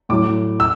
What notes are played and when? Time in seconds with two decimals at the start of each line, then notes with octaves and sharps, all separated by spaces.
0.09 A2 F#3 D6
0.60 E6